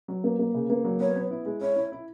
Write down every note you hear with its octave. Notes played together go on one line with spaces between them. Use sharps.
F#3
A#3
A#3
C#3
A#3
F#3
B3 C#5
B3
E4
G#3
E4 C#5
E4
E4